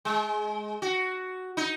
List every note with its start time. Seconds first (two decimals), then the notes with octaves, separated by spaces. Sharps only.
0.05 G#3
0.82 F#4
1.57 D#4